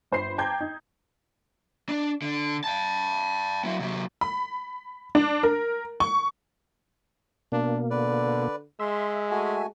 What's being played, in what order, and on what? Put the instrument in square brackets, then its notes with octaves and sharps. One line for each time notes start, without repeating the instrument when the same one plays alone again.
[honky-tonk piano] G1 C5 B5 C7
G5 A5 A#5 D6 G6 G#6
D#4
[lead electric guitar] D4
D3
G5 A5
F#3 E4
C3 F#3
[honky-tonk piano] B5
D4
A#4
C#6
[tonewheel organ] B2 A#3 [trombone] D4
[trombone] D3 [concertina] B4 D5
[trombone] G#3 [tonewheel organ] E5 [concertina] C6
[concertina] A3 F#4 G#5